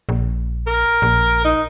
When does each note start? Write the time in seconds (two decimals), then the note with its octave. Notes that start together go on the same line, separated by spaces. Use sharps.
0.09 A#1
0.67 A#4
1.02 A#1
1.44 D#4